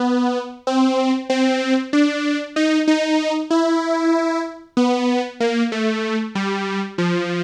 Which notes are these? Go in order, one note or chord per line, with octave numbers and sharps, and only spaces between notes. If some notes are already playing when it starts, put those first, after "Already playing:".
Already playing: B3
C4
C4
D4
D#4
D#4
E4
B3
A#3
A3
G3
F3